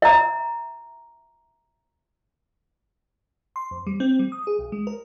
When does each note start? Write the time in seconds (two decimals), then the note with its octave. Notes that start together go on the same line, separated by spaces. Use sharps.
0.02 E5 A#5
3.56 C6
3.71 F2
3.87 G3
4.00 C4
4.19 G3
4.32 D#6
4.47 G#4
4.59 B1
4.72 G#3
4.87 A#4